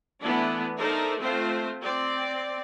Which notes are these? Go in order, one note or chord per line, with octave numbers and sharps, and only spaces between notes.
E3 A3 B3 D4 E4
D#4 A4 A#4 C5 D5 E5
A3 C4 F4 C5
C4 D5